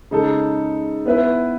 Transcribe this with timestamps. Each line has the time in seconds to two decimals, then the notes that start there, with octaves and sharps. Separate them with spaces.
0.11 C#3 G#3 D#4 A4
1.06 B3 E4 B4 E5